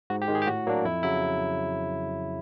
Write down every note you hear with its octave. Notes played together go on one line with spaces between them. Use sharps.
G#2 F#4
G4
D#3 G#3
G#4
G4
A2 F#4
F#3 A#3 D4
F2 E4
C#3 F#3 E4